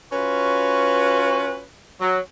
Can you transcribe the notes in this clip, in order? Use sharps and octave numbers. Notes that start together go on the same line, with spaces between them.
C#4 F4 F#4 B4
F#3